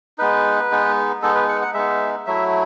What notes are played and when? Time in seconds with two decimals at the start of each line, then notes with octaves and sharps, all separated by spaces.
0.18 G#3 B3 D#4 B4
0.71 G#3 B3 D#4
1.22 G#3 B3 D#4 A4
1.35 B4
1.48 F#5
1.62 F#5
1.74 G#3 B3 D#4 E5
2.26 F#3 A3 E4 E5